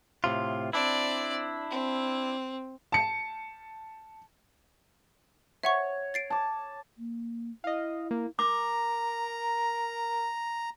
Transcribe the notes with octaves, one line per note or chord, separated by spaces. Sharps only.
A2 C3 F4
C4 D4 E4 D5
C4
A5 C#7
C#5 E5 F#5 C#6
A6 C7 D7
A5 D6
A#3
E4 D#5 F5
A#3
A#4 A#5 D6